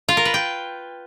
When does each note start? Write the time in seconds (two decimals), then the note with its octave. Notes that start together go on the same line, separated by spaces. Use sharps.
0.09 F4
0.17 A#4
0.25 B4
0.34 G5